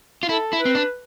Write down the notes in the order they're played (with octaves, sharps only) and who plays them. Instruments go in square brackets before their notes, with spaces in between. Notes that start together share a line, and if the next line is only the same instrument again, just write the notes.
[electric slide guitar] F4
[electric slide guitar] E4 [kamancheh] A4
[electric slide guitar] E4
[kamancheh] B4
[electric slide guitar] C4
D4